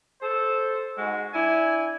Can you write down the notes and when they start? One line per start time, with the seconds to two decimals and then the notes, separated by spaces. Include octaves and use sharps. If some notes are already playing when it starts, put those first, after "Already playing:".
0.20 A4 C5
0.98 G#2 G#3 F#4
1.33 D4 E4 G#5